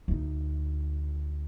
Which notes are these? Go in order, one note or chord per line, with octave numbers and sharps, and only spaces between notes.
D2 D#4